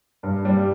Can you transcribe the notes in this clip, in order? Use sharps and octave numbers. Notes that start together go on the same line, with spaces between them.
G2
G3